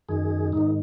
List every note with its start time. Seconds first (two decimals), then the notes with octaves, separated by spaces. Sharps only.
0.09 F#2 D#3 G#4
0.52 G#2 D#3 D#4